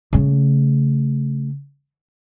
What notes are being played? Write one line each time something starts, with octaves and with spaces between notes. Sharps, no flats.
C#3 A3